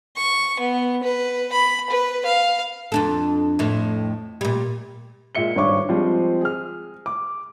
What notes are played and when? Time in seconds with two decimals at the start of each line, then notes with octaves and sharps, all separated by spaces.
0.16 C#6
0.60 B3
1.03 B4
1.53 B5
1.90 B4
2.26 F5
2.92 F2 D4 A4
3.59 F2 A2
4.41 A#2 G3
5.35 A#2 G#3 E5 C#7 G7
5.56 G#1 G2 D4 C#5 C#6 D6
5.89 F3 G3 G#3 C4
6.41 G#4 F6
7.06 D6